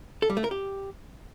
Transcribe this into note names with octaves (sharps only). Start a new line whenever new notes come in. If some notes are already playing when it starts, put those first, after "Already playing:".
A4
G3
A3
A#4
G4